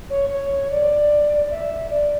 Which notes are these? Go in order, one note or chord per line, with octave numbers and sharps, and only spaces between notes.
C#5
C#5
D5
E5
D5